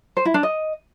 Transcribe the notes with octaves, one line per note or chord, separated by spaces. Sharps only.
C5
E4
D4
D#5